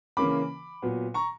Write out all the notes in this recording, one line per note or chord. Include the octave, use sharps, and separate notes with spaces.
C#3 E3 A#3 C#4 B5 D6
A#2 F#3 B3
A#5 C#6